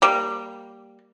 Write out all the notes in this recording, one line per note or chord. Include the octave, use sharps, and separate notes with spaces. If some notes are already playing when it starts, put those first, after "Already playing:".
G3 A#3